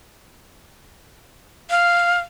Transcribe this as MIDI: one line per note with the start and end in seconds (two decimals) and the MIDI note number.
1.70 2.19 77